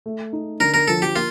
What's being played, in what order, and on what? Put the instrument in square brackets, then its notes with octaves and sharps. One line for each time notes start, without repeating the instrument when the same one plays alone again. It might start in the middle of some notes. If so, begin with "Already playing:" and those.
[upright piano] A3
D#4
[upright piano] D3 [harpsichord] A#4
[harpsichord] A#4
[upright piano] F3 [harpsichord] A4
[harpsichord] G4
[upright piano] A#3 [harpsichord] F4